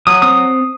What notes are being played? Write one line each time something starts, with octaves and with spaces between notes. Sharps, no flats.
F#3 D#6
C4 D#6